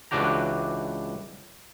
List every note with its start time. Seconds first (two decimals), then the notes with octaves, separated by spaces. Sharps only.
0.11 C#2 E3 D4 F#4 G4 A#5